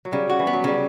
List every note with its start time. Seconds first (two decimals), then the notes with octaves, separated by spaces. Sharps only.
0.05 F#3
0.12 C#3 G3
0.30 F#4
0.39 E3
0.47 B3
0.53 F#3
0.64 C#3 G3